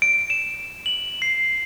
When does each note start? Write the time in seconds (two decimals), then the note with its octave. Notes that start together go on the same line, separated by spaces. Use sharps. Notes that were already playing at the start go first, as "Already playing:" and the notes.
0.02 D7
0.30 E7
0.86 F#7
1.22 C7